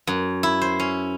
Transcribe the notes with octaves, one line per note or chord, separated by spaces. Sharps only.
F#2
E4
C5
C#4